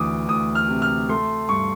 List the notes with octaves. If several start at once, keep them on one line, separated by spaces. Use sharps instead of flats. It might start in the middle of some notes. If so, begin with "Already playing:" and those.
Already playing: D2 E3 D6 D#6
D2 D#6
F6
C3
F6
A3 C6
G2 C#6